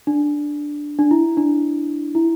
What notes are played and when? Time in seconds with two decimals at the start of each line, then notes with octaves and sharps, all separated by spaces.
0.07 D4
0.99 D4
1.11 E4
1.37 D4
2.15 E4